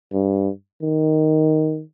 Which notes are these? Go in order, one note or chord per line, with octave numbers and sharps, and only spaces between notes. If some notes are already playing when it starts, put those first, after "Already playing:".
G2
D#3